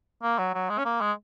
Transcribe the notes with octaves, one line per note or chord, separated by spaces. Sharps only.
A#3
F#3
F#3
G#3
C#4
A#3
G#3